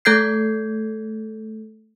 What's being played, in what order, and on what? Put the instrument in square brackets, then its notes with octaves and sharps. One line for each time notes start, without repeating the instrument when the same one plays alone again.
[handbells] A3 A4 G6 G#6 C7